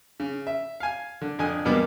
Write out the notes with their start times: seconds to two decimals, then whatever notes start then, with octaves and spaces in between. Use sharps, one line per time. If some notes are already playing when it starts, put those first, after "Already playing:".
0.20 C#3
0.47 E5
0.80 F5 G#5
1.22 D3
1.39 F2 D3 G#5 D#6
1.65 E2 G2 B2 A#3 B3 D6